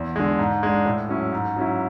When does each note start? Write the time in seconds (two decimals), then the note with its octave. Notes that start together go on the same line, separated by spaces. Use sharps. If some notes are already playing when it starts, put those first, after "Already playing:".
Already playing: E2
0.16 D3 G#3
0.39 G#2
0.63 G#3 D4
0.86 A2
1.09 F#3 C#4 E4
1.33 G#2
1.56 F#3 C#4 E4